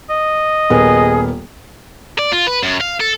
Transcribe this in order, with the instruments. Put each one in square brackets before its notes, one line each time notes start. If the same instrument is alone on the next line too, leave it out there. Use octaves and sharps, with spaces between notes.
[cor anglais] D#5
[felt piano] D#1 B3 A#4 [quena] G#4
[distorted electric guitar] D5
F4
B4
F#2
F5
A4